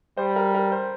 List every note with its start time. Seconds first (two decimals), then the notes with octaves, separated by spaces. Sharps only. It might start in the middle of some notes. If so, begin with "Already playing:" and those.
0.17 G3 C5
0.36 A#4
0.55 A#4
0.72 C5